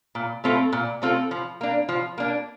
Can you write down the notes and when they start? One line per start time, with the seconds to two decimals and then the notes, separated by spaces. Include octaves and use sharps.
0.15 A#2
0.44 A3 C4 F4 A4
0.72 A#2
1.02 A3 C4 F4 A4
1.31 F3
1.61 A#3 D4
1.89 F3
2.18 A#3 D4